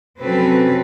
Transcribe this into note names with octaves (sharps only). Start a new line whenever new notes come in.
C3 F#3 C4 C#4 A4 B4